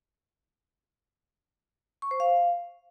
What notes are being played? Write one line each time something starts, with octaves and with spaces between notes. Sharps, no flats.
C#6
C5
F5